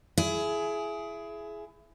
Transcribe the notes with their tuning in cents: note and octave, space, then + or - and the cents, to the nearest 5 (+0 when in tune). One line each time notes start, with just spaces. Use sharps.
E4 +25 G#4 +20